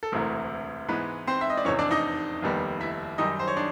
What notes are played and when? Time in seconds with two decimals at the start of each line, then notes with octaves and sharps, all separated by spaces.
0.03 A4
0.12 E1 D2 C3 E3 A3 A#4
0.88 G#2 E3 G#3 B3 B4
1.27 C4 C5
1.41 E5
1.50 D#5
1.57 D5
1.65 F1 E2 C3 C#4 C#5
1.79 D4 D5
1.91 D#4 D#5
2.42 F1 D#2 D#3 G3 B3
2.81 E4 E5
3.18 F#2 D#3 G3 D#4 D#5
3.39 C5
3.48 C#5
3.57 D4